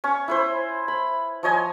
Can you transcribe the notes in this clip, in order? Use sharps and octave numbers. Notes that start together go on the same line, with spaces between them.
C#4 C#6
E4 B4 C5
B5
F3 C#5 D#5 G#5